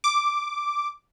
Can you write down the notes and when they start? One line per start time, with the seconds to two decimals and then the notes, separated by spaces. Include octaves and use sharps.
0.04 D6